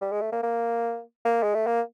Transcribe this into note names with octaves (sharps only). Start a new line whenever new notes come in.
G3
G#3
A3
A#3
A#3
A#3
G#3
A3
A#3